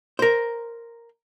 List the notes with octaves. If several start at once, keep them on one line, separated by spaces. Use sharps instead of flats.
A#4 C5